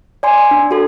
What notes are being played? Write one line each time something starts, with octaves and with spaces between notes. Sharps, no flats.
D5 G#5 C6
D4
F#4 A4